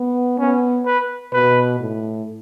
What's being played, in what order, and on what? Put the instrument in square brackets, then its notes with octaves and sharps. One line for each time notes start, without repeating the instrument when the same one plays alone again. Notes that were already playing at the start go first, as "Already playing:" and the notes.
Already playing: [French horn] B3
[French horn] B3 [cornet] C#4
[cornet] B4
[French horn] B2 [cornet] B4
[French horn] A2